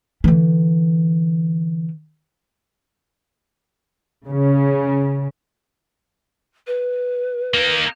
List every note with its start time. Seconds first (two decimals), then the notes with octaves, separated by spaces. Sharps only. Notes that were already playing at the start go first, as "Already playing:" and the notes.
0.24 D3 E3
4.25 C#3
6.66 B4
7.54 A#3 D#4